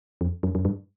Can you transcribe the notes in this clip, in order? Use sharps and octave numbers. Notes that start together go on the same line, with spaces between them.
F2
F#2
F#2
G2